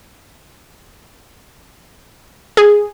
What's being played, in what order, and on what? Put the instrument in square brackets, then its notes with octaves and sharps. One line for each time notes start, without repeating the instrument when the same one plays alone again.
[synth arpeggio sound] G#4